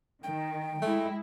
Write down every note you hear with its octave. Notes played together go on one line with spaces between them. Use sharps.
D#3 G5
G#3 A3 E4